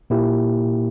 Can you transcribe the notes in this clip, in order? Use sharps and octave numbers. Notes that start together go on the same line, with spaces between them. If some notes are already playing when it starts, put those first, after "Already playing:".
A#2 A#3 E4 G4